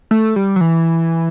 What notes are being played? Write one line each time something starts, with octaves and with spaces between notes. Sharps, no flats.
A3
G3
F#3
E3